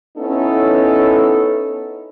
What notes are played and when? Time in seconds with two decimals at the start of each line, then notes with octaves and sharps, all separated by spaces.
0.17 B3 C#4 D#4 E4 A4